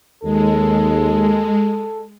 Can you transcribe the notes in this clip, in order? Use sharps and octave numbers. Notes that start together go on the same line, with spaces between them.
D#2 G#3 A4